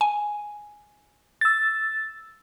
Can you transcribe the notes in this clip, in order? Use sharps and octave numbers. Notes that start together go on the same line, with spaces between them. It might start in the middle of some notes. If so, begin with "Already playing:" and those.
G#5
E6 A6